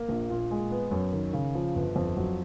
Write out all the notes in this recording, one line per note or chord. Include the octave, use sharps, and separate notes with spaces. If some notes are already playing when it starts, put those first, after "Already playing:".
Already playing: A#3
A#1
A#2
G#3
B3
F#2
D#3
C#3
F3
G1
F2
F#3